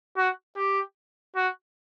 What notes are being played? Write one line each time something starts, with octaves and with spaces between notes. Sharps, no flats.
F#4
G4
F#4